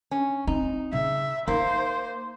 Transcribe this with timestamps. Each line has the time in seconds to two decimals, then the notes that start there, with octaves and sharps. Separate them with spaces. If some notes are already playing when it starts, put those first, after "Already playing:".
0.11 C#4
0.47 C4 D#4
0.93 C#3 E5
1.48 A#3 D#4 C5